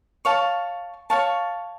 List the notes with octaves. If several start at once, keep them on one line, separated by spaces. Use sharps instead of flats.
C#5 F5 A5 C#6
C#5 F5 A5 C#6